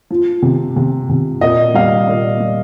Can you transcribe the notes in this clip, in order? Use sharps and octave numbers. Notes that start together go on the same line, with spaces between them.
F3
C3
C3
C3
A#2 D#5
G3 F5
A#2
G3